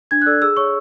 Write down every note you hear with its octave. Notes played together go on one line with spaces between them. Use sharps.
D4 G#6
F#6
A4 D5 E6
G#4 E6
C#5 C#6